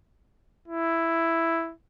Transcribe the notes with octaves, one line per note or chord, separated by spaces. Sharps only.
E4